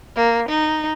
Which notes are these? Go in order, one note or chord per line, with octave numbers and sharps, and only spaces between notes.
A#3
D#4